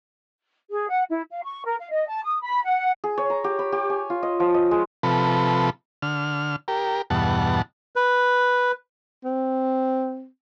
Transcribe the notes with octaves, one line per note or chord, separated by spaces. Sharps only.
G#4
F#5
E4
F5
C#6
A#4
F5
D#5
A5
D#6
B5
F#5
G#4
C#5
A#5
G4
B5
G4
G#5
F4
D#5
F3
D#5
G#3
C3 F3 A4 B4
D3 F6
G4 A#4
E2 G2 B2 F#5 A5
B4
C4